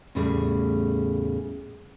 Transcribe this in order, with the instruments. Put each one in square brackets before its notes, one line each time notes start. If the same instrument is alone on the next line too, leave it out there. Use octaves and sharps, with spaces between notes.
[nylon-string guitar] E2 A2 C#3 G3 A3 G#4